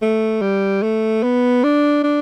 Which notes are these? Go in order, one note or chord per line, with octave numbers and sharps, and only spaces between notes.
A3
G3
A3
B3
D4
D4